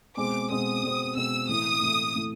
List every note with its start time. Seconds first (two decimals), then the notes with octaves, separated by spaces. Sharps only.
0.17 B2 G#3 C4 D6
0.50 B2 G#3 C4 D#6
0.83 B2 G#3 C4
1.16 B2 G#3 C4 E6
1.49 A2 E3 A3 D#6
1.82 A2 E3 A3
2.16 A2 E3 A3